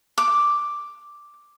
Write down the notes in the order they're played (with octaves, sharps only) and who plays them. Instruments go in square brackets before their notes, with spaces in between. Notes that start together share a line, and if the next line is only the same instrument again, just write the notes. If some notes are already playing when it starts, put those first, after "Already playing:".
[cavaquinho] D6